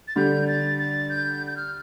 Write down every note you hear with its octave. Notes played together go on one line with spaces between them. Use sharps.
A6
D3 G3 G6
A6
A6
G6
G6
F6